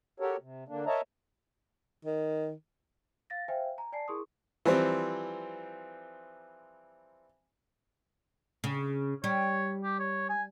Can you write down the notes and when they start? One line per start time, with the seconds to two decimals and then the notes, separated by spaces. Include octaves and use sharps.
0.20 F#4 G4 A4 A#4 C#5
0.41 C3
0.68 D3 A#3 D4
0.86 A#4 C#5 D#5 E5 A5 A#5
2.05 D#3
3.30 F5 A6 A#6
3.48 C5 E5 F5 G5 G#5
3.78 G#5 A#5
3.92 D5 G#5 A5 C7
4.08 E4 G#4 A#4 C6 C#6 D#6
4.65 E3 F3 G3 C4
8.64 C#3
9.24 G3 C#5
9.84 G4
9.99 C#5
10.29 G#5